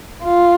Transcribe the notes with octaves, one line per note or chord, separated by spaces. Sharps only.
F4